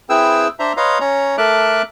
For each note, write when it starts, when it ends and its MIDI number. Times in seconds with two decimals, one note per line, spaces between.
0.10 0.48 60
0.10 0.48 64
0.10 0.48 68
0.10 0.48 71
0.10 0.48 79
0.10 0.48 88
0.59 0.73 62
0.59 0.73 72
0.59 0.73 76
0.59 0.73 82
0.77 0.98 71
0.77 0.98 73
0.77 0.98 75
0.77 0.98 77
0.77 0.98 82
0.77 0.98 84
1.01 1.36 61
1.01 1.36 73
1.01 1.36 82
1.38 1.82 57
1.38 1.82 69
1.38 1.82 70
1.38 1.82 76
1.38 1.82 86
1.38 1.82 90